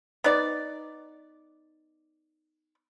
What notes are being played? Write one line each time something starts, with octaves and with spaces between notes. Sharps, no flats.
B3 D#4 D5